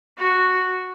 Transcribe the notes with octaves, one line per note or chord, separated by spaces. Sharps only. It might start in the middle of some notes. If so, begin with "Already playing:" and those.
F#4